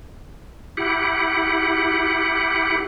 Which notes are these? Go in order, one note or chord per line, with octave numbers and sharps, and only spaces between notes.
E4 G4 F#5